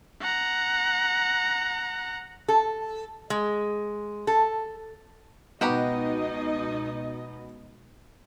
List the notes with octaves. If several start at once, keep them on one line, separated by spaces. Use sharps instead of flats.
F#5 A#5
A4
G#3
A4
C#2 B2 B3 D#4 F#4 G4 D#5 A#5